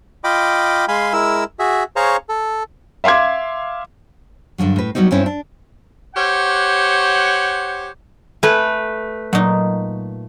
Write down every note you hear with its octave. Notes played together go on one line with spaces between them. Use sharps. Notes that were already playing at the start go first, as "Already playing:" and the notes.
F4 D#5 G5 B5 D6
G#3 F5 G#5 B5 C6
G#3 E4 A#4 E6
F#4 G#4 E5
G#4 C5 C#5 F5 A#5 C#6
A4
E5 F5 C6 D6 G#6
G2 D3 F3 F#3
A2 B4
F#3 G3 B3 C4 D#4
G2 C4 C#4 E4
D4
G4 C5 C#5 F#5
A3 B4 G#5
A#2 F#3 D#4